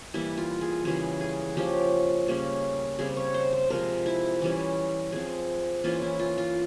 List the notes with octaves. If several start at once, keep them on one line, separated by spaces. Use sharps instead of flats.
E3 G3 A#3 E4
F4
G#4
C#3 E3 G3 C#4 G#4
G#4
F3 A#3 C#4 G4
C#3 G3 A#3 C#4
C#3 G3 C4 G#4
C#5
C5
C5
C3 F3 G#3 A#4
E4
E3 G3 C#4
F3 C4 G#4
E3 A#3 C#4 F4
E4
F4
F4